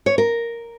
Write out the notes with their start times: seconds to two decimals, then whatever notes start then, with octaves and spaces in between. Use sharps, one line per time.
0.06 C#5
0.18 A#4